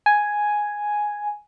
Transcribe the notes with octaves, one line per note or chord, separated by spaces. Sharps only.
G#5